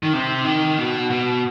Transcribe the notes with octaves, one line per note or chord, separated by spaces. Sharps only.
D#3
C3
D#3
B2
B2